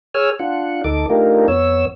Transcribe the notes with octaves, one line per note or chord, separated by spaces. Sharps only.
G#4 C#5 G#5 E6 F6
D4 F4 F#5
D2 D#4 A4 D6
A3 D4 D#4 F4 G4 A#4
F2 B3 C#5 E6